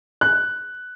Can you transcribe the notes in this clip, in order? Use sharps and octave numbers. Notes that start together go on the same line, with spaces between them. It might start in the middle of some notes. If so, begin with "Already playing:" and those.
F#6